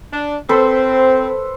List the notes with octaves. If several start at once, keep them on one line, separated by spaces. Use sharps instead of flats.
D4
C4 A4 B4 C5